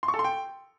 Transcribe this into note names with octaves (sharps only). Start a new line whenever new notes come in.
C6
C#6
A4
C6
G5